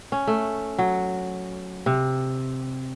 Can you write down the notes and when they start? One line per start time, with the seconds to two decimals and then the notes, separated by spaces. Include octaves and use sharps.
0.12 C#4
0.27 A3
0.78 F#3
1.86 C3